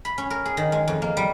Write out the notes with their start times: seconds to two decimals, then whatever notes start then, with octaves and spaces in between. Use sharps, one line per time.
0.05 B5
0.18 C#4
0.30 A#4
0.45 G#4
0.57 D#3
0.72 G#3
0.88 F2
1.02 A#3
1.17 G3